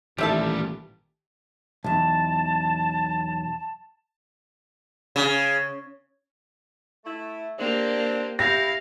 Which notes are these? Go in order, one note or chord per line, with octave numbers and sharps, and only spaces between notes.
A1 A#2 D#3 G3 G4 A4 E5 A5
B1 E2 A5
C#3
A3 E4
A#3 C4 D4 G4
E4 G4 F5 A#6